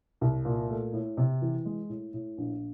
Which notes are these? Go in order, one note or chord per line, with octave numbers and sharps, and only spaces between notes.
C2
A#2
A3
A2
C3
E3
G#3
A2
A2
A#1